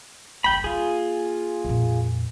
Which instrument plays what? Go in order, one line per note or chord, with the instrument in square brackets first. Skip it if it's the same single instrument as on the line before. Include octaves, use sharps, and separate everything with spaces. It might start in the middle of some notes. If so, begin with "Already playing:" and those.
[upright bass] F#1 F#2 [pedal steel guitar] G5 B5
[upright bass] A#3 [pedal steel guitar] F4 G#4
[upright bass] F2 A#2